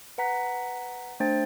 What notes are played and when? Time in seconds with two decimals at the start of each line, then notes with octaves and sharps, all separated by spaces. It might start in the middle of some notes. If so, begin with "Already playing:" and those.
0.18 B4 F#5 A#5 B6
1.20 A3 D4 C5 G5 A6